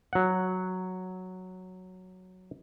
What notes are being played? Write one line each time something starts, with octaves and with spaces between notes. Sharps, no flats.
F#3 F#5